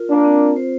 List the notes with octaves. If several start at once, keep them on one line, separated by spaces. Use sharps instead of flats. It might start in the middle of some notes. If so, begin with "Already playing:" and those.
Already playing: F4 A#4
A#3 D4
C4
C5